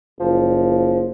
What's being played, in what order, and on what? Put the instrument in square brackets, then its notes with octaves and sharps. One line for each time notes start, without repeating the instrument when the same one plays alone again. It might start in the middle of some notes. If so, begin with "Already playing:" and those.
[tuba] F#1 [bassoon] F3